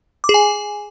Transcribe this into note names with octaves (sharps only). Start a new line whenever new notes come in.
D6
G#4
G#5